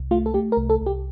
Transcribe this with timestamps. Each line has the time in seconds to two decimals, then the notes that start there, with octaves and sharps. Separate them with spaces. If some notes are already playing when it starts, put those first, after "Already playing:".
Already playing: C2
0.11 A3 F4
0.26 A4
0.34 A3 G4
0.52 A#4
0.57 C2
0.70 A4
0.81 C2
0.86 G4